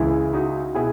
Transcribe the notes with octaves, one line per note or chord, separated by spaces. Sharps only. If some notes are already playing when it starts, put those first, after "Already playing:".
Already playing: C#2 C#3 E3 E4 G#4
D#4 F#4
B2 E4 G#4